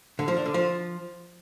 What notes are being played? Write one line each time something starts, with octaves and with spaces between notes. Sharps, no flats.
D3
F3
D4
D3
F3